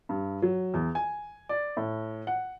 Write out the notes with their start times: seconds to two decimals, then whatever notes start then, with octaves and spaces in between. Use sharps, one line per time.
0.09 G2
0.42 F#3
0.74 E2
0.95 G#5
1.49 D5
1.77 A2
2.27 F#5